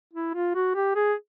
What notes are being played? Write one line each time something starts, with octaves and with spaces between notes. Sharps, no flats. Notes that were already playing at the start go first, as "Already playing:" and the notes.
E4
F4
F#4
G4
G#4